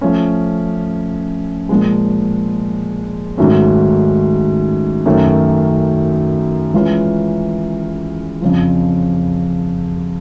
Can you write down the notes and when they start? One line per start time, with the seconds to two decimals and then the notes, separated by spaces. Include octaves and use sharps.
0.01 F3 A3 C#4
1.69 A#2 F3 G#3
3.37 G#2 D#3 F#3 A3 C#4
5.05 F#2 D#3 F#3 A3 C#4
6.74 E3 G#3 C#4 F4
8.42 F2 C#3 F3